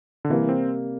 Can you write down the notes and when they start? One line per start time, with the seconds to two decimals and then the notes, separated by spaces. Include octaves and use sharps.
0.25 D3
0.29 C3 E3 G3 A#3
0.49 C4